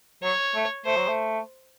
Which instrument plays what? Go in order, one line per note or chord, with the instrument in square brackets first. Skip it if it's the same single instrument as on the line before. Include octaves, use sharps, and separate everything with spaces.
[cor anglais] F#3 [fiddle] C#5
[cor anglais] A3
[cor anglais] A3 [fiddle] C5
[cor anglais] F#3
A3